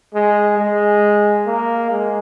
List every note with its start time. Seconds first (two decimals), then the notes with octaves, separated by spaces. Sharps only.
0.14 G#3
0.58 G#3
1.46 A#3
1.91 G#3